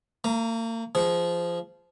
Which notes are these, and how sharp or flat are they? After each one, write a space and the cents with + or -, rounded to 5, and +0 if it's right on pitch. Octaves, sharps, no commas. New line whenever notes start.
A#3 -40 A#5 +10
F3 -20 G#4 -20